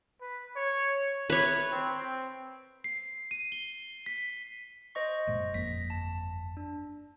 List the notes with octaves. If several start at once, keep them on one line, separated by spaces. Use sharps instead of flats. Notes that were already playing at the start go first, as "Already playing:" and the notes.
B4
C#5
E4 B4 C#5
C4
C7
D#7
G7
B6
C5 D#5 C#6
F#1 A#2 G#3
G1 F2 A#3 A#6 B6
A5
D4